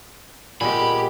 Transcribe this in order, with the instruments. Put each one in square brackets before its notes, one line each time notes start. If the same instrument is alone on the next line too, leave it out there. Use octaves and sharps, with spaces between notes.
[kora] A#2 G#3 [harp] B3 C4 G#5 [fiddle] G4 [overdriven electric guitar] B5